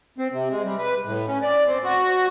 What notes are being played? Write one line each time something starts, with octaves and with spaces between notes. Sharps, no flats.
C4
C3
G#3
G3
B4
A2
C#4
D5
C4
F#4